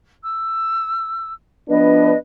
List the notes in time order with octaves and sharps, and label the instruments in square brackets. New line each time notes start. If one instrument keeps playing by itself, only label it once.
[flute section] E6
[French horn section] F3 B3 D4 [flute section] B4 D#5